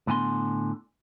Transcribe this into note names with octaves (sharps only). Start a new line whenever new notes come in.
A2 D3 B3 G#5 A5 C6